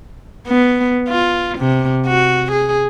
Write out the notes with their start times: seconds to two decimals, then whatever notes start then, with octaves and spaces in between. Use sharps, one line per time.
0.48 B3
1.09 F4
1.58 C3
2.07 F#4
2.52 G#4